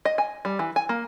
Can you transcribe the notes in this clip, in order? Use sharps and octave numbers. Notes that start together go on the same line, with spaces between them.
D#5
G#5
G3
E3
G#5
A#3